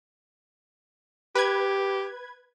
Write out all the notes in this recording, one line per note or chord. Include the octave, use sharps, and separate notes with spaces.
G4 B4 G#6